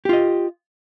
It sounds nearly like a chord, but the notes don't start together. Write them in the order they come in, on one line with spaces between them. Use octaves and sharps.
G4 F4 D#5